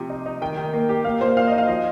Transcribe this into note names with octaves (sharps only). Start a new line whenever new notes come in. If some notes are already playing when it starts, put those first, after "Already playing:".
Already playing: C3 F3
D#4
D#4
D#3 G5
D#3
A#3
G4
A#3 F5
A#2 C5
A#2 F5
D#5
D#4
F5
F3 D#5